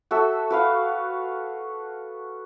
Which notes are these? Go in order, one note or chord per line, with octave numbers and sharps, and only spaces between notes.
F#4 A4 E5
F#4 B4 F5